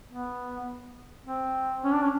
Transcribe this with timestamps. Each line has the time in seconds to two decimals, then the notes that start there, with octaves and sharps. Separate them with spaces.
0.08 B3
1.25 C4
1.84 C#4
1.93 D4
2.03 C#4